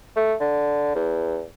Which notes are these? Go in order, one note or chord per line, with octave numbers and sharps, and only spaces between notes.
A3
D3
E2